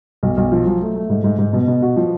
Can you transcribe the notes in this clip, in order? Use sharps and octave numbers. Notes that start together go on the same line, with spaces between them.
B1
B1
F3
F#3
A3
A3
G#2
G#2
G#2
B2
B2
F#4
F3